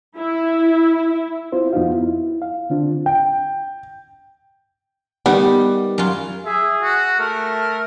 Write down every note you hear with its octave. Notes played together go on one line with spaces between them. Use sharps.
E4
C4 E4 F4 C5
F2 B3 D#4 F4 F#4 F5
E4
F5
D3 C4 D4 F4
G5
D#3 G3 B3
F#2 F4
G#4 E5
F#4
A3 A#4